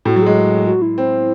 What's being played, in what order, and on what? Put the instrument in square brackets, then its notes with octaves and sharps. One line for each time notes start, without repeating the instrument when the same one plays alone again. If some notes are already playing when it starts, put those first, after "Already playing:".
[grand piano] A2 [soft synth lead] F#4
[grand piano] F#3
[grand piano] G#3 [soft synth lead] G#4
[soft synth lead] F#4
E4
[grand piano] C4